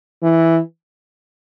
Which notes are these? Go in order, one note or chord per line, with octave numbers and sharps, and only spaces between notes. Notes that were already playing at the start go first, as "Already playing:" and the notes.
E3